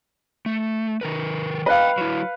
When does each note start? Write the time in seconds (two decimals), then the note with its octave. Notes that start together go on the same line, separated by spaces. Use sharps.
0.46 A3
1.01 D#3 A#4 B4
1.66 B4 D#5 F5 G5
1.98 F#3 E4